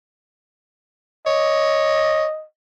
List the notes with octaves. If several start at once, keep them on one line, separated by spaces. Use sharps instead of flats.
C#5 D#5